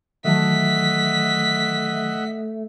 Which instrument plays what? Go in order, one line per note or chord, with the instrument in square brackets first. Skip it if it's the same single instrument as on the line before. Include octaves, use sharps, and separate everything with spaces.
[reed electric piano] D#3 E3 F#3 [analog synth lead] A3 [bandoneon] D#5 E5 F#5 [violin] B6